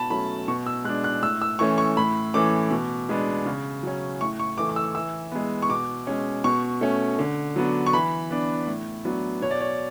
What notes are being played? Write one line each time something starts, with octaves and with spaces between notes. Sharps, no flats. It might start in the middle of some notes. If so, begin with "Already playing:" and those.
Already playing: B2 A5 B5
F#3 A3 C#4 B5
B2 C#6
E6
G#3 D4 F#6
F#6
A2 E6
E6
E3 A3 C#4 C#6
C#6
A2 B5
E3 A3 C#4 D6
B2
G#3 B3 D4
C#3
F#3 C#4
A2 C#6
C#6
E3 A3 D6
D6
E6
E3 E6
G#3 B3
C#6
B2 D6
G#3 C#4
B2 C#6
A3 C#4
D3
F#3 B3 D4
C#6
E3 B5
B3 D4
A2
F#3 B3 D4
B2 C#5
D5
C#5